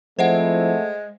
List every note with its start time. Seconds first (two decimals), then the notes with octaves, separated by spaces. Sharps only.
0.19 F3 G#3 A3 C4 E4 C5 E5 F#5